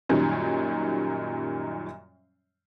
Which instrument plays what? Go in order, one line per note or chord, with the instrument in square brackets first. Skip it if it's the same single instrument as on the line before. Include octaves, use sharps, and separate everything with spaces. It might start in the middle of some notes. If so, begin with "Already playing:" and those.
[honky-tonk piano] F#2 A#2 D#3 G3 C#4